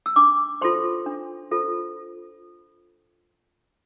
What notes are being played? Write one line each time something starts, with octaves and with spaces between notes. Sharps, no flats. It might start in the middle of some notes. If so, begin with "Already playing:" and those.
E6
D4 D6
F4 A4 C5 C6
D4
F4 A4 C5